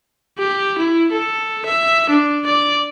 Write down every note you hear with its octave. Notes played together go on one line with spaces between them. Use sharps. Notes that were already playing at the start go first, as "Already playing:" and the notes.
G4
E4
A4
E5
D4
D5